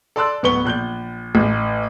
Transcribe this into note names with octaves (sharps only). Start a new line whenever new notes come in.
A4 D5 A5 C6 E6 F#6
D1 B3 B4 C#6 G7
A#1 F#6 G6 G7
A1